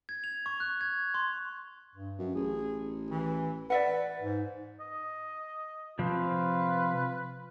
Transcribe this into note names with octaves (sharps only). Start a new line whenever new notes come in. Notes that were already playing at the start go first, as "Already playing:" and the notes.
G#6
F7
C#6
F#6
G#6
C6
G2
F#2
A1 G#4
E3
B4 D5 E5 F#5
G#2
D#5
C3 F3 C4 F4 B4